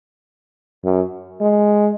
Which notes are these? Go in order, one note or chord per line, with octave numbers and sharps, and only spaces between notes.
F#2
G#3